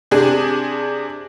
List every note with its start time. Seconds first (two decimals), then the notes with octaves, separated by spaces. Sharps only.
0.11 C3 D4 G#4